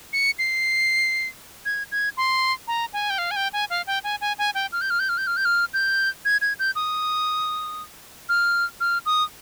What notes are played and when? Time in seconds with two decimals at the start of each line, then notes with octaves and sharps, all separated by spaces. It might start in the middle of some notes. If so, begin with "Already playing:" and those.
0.13 C#7
0.39 C7
1.66 G#6
1.92 G#6
2.17 C6
2.68 A#5
2.93 G#5
3.10 G5
3.18 F5
3.31 G#5
3.36 G5
3.53 G#5
3.70 F5
3.87 G5
4.04 G#5
4.21 G#5
4.38 G#5
4.55 G5
4.72 F6
4.81 G6
4.90 F6
5.00 G6
5.09 F6
5.18 G6
5.27 F6
5.37 G6
5.45 F6
5.73 G6
6.25 G#6
6.42 G#6
6.59 G6
6.76 D#6
8.29 F6
8.80 F6
9.06 D#6